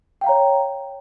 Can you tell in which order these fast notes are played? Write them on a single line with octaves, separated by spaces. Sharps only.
G5 F5 A#5 C#5